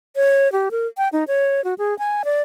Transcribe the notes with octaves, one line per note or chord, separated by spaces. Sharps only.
C#5
G4
A#4
G5
D#4
C#5
F#4
G#4
G#5
D5